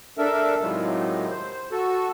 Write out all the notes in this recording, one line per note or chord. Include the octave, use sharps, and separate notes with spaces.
D4 A4 A#4 E5
A2 C3 D#3 F3 F#3 G#3
C5
F#4 A4